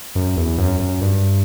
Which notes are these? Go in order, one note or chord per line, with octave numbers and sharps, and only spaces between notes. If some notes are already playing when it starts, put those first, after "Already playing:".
F#2
E2
F#2
F#2
G2